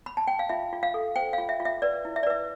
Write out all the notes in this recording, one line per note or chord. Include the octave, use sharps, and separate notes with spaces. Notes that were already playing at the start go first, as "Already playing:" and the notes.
B5
A5
G5
F5
F4 E5
F4
F5
A4
C5 G5
F5
F4
E5
F4
E5
B4 D5
E4
E5
D5
B4 E5